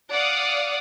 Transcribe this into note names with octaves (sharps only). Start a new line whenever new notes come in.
D5 F5 F#5 D6 D#6